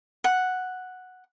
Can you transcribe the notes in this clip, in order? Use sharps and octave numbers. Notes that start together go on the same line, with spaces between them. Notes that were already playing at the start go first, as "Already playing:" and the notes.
F#5